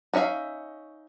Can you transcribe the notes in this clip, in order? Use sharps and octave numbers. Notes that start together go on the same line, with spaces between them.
B3 C#4 D#4 E5 F5